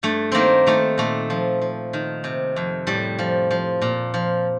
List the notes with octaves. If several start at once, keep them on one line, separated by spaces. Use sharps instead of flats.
G2 A3
D#3 A#3 C4
D#3 A3
A#2 A3
F3
F3
D#3
C3
F2
A2 G3
F3
F3
A#2
F3